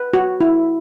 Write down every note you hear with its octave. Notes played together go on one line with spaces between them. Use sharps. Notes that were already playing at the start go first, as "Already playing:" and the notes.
Already playing: B4
F#4
E4